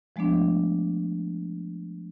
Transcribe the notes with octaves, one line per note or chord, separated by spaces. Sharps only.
F3 G#3 A3 B3 D4